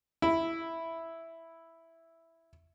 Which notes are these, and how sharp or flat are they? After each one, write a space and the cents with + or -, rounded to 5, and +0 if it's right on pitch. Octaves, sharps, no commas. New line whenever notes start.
E4 +0